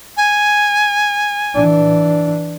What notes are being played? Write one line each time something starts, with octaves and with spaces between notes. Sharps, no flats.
G#5
E3 D4